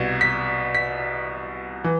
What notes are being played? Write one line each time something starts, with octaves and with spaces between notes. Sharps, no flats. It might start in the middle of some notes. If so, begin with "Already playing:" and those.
Already playing: C2 B2 G#6
B6
B6
E3